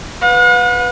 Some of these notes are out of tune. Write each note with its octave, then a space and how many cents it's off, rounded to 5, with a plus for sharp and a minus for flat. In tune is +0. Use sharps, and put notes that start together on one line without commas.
B4 +0 F#5 -45